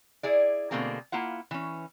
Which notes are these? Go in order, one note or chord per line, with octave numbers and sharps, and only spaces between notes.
E4 G#4 D5
B2 D3 A3 A#3 C4 G#4
A#3 E4 F4 F#5
E3 C#4